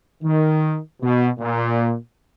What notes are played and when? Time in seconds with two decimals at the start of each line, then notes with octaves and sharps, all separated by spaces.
0.23 D#3
1.01 B2
1.39 A#2